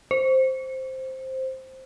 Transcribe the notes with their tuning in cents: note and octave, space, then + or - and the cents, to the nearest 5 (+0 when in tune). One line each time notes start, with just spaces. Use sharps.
C5 +5